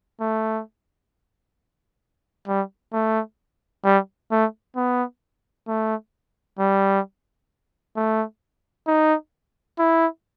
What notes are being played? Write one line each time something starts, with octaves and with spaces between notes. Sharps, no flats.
A3
G3
A3
G3
A3
B3
A3
G3
A3
D#4
E4